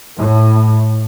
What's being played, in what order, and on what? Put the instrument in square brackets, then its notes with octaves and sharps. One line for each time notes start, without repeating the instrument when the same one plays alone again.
[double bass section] A2